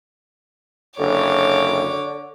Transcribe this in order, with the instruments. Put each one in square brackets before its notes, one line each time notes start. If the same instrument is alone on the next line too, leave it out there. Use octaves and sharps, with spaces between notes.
[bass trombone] F#1 [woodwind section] D3 [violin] C#5 D6